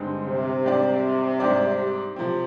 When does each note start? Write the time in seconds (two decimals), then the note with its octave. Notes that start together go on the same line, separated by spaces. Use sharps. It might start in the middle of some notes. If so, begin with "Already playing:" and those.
Already playing: G2 D3 G#3 C4 D#4
0.26 C3
0.65 G#2 G3 D4 G4 D5
1.40 G#2 G3 D4 G4 D5
2.16 C3 F3 C4